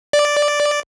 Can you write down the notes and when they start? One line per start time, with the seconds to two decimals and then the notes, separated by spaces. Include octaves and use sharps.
0.13 D5